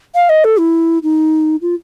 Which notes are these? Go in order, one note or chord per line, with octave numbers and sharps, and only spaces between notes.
F5
D#5
A4
E4
D#4
F4